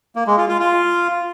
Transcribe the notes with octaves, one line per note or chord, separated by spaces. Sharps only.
A#3
G#3
F4
F4
F4